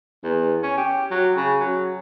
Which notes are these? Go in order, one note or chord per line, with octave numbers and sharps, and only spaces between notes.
E2
C#4
G4
F#3
C#3
F#3